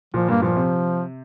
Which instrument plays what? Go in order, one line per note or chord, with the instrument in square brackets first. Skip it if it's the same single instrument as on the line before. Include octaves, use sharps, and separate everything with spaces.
[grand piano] A#2 [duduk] F3
[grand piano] G2 [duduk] A#3
[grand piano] A#2 [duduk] F3
[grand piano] C3